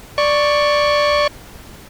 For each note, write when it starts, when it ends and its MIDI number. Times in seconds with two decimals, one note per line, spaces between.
0.18 1.27 74
0.18 1.27 85